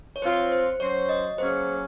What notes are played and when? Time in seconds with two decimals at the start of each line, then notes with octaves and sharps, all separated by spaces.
0.16 C#5
0.22 F3 C4 F4 C5
0.52 C5
0.80 F#3 C#4 F#4 C5 C#5
1.09 D#5
1.38 F#3 A#3 C#4 G#4 C5